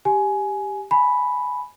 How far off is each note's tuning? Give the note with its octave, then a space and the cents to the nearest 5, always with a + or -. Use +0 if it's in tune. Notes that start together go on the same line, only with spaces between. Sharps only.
G4 +5 G#5 +15
G#5 +20 B5 +0